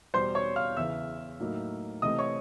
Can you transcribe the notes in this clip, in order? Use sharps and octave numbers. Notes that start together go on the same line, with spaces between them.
E2 B2 G3 C5 C6
C#5 C#6
F5 F6
E2 C#3 E3 E5 E6
A2 F#3 A#3 D#4
C3 E3 A3 C4 D#5 D#6
C#5 C#6